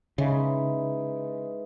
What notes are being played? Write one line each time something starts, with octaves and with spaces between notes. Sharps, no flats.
C#3 E3 G#3 D#4